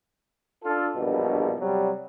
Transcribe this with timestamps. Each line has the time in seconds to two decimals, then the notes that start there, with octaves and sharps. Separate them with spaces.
0.65 D4 F4 A4
0.96 A#1 E2 G2 B2
1.60 C3 F#3 G3